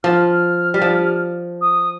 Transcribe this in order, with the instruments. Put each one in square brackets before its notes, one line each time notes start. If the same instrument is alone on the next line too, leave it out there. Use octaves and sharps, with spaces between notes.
[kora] F3 [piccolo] F6
[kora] G3
F3
[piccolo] D#6